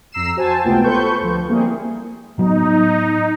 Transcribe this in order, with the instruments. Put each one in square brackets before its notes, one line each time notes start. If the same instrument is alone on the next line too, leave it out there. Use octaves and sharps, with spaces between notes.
[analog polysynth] F2 A#5 E6 C7 E7
F#4 C5 G#5 A5
C#2 C3 A3 B3 F4 G5
A4 B4 C5 C#6 G6
D2 F3
G3 A#3 C4 E4 G#4
[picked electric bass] A2 F#3 B3 [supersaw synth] D#4